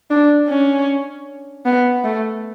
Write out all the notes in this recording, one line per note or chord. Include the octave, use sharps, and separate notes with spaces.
D4
C#4
B3
A3